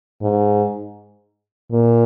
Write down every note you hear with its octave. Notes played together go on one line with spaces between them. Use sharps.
G#2
A#2